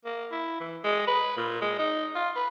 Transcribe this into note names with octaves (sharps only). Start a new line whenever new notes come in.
A#3
E4
E3
G#3
B4
A#2
G#3
D#4
F4
B4